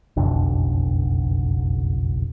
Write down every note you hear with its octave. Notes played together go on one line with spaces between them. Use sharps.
F#1 B1 F2 D3